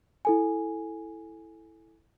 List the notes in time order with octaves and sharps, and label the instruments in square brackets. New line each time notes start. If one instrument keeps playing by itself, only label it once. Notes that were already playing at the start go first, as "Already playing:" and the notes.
[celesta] E4 A4 G#5